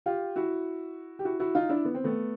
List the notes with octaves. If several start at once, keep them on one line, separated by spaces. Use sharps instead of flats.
F4 G4
E4 F#4
G4
E4 F#4
E4 F#4
D#4 F4
D4 E4
B3
C4
A3 B3